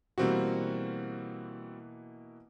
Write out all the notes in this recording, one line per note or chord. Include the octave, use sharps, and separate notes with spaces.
B2 E3 G3 A#3 C4 F#4